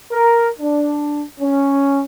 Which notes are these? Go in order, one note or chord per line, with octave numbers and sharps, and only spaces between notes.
A#4
D4
C#4